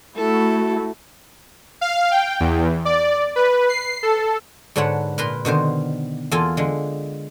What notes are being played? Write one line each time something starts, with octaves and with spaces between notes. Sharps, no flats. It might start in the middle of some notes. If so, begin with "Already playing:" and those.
A3 E4 F#4 A4
F5
G5
E2
D5
B4
C7
A4
G#2 D3 D4 B4 C#5 F#5
A#2 A#4 B4 A#5 C6
B2 D3 D#3 C5
E2 A#3 F4 A4 G#5
D3 G#3